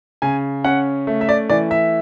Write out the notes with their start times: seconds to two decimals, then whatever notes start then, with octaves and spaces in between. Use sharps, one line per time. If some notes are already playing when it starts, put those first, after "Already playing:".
0.22 C#3 G#5
0.64 C#4 F#5
1.07 A3
1.21 E5
1.29 D5
1.49 E3 D5
1.71 E5